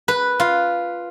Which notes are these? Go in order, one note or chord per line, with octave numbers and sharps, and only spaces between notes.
B4
F4